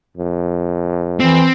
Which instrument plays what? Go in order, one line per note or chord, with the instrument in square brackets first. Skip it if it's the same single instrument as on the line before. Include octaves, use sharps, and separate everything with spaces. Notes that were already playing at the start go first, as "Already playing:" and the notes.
[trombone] F2
[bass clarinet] E3 [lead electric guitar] C4